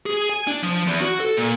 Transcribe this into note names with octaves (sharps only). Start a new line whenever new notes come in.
G#4
G#5
D4
F3
E2
F#4
A4
A#2